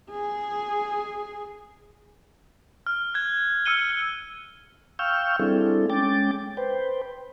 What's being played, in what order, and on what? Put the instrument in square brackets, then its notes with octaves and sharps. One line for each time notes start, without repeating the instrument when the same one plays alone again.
[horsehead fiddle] G#4
[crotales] F6
F#6 G#6
E6 F6 C#7 D#7 G7
[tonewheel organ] F5 G5 C#6 E6 F6 G6
G3 C4 D4 E4 G#4 A4
G#3 C#4 G5 D6 A6
B4 C5 G5